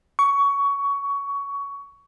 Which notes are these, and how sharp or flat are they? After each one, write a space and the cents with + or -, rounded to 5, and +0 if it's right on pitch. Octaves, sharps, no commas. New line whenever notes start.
C#6 +20